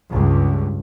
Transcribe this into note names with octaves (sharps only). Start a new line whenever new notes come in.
C#2 G2